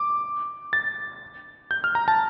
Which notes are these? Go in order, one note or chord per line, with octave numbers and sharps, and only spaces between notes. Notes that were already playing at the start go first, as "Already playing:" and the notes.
Already playing: D6
A6
G6
F6
A#5
A5